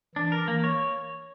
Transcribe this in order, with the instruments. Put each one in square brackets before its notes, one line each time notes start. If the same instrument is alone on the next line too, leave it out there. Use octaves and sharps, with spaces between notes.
[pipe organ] E3 [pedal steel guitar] D4
[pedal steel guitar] A#4
A#3
C#5